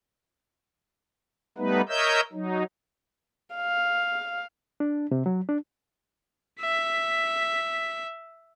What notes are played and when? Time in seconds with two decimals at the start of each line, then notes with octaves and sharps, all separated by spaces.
1.58 G3 A3 B3 D#4 B4
1.89 A#4 C#5 D#5 E5 E6 G6
2.33 F#3 D#4
3.56 F5
4.80 D4
5.11 C3
5.26 F#3
5.49 D4
6.61 E5 B6